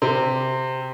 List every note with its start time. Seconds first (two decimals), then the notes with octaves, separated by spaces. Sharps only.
0.02 C3